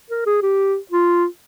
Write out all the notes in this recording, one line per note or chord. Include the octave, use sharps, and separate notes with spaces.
A#4
G#4
G4
F4